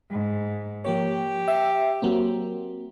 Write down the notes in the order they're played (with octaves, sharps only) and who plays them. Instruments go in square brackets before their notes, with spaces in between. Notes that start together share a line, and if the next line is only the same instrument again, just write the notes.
[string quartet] G#2
[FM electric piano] F3 A#3 C#5 [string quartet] G4
[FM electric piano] E5
F#3 A#3 C4